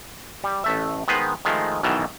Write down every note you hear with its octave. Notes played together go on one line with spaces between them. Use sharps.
G3
A1 A3 E5
D#3 G#3 B3 B4 C5
D#3 F3 G#3 A3
B1 B2 D#3 E3